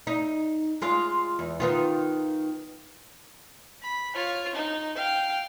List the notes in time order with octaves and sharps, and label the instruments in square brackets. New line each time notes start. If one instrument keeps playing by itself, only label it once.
[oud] D#4
G#3 F4 F5
E2
D#3 B3 F4
[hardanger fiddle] B5
F4 C#5
D#4
F5 G5